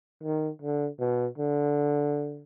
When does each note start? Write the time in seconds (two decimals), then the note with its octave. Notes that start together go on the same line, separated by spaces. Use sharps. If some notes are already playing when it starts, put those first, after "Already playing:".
0.23 D#3
0.62 D3
1.00 B2
1.38 D3